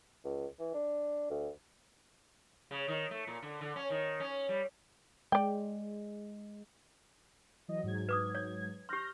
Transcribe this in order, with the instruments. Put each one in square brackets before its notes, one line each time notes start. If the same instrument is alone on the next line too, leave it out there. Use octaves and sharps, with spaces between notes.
[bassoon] C#2
E3
D4
D2
[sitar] C#3
D#3
A3
A#2
D3
D3
C#4
D#3
C#4
G3
[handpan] G#3 [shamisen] D5 G5
[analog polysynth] E3 F#3 D#5
G#2 F#3 G#6
[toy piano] B4 D6 D#6
C#5
[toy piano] G4 C6 [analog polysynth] F6 G6 A#6